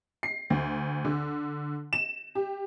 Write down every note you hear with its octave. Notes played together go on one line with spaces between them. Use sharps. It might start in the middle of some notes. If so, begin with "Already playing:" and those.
C7
D2
D3
E7
G4